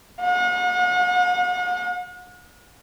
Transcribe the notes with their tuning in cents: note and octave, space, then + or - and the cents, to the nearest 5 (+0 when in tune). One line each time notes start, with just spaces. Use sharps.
F#5 -45